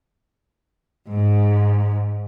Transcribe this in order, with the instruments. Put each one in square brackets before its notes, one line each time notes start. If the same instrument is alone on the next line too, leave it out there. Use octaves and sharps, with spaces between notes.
[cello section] G#2